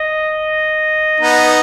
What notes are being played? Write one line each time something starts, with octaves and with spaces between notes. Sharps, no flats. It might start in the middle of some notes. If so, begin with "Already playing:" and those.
Already playing: D#5
B3 D#4